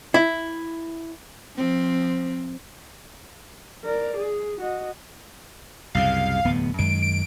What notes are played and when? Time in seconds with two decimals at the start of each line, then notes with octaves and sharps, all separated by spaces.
0.14 E4
1.56 F3 C4
3.84 A#4 D5
4.17 G#4
4.61 F#4 D#5
5.95 C2 F#2 C#3 F5
6.45 D1 E2 B3
6.79 F#2 D#3 G#3 D7
7.03 D7